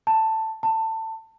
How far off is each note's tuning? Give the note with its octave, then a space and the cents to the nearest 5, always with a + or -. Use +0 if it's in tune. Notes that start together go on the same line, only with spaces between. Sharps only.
A5 +10
A5 +20